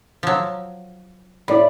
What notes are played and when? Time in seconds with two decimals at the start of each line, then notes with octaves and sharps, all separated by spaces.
0.23 F3 F#3
1.48 A2 E4 D5 B5